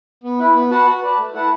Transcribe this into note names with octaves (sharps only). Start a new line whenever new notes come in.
B3
E4 B4
B3
F#4 B4 F#5 A5
F#4
B4 D5 A5
A3
E4 B4 F#5 A5